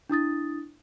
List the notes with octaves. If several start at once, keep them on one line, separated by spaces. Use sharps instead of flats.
D4 E4 D#6 A6